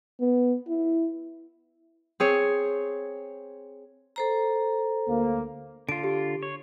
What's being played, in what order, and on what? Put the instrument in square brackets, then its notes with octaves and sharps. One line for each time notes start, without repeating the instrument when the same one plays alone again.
[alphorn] B3
E4
[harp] C4 G#4 C#5
[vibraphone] A4 C5 A#5
[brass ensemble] D2 A#3
[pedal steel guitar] D3 F4 [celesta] D7
[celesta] G4
[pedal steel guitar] C#5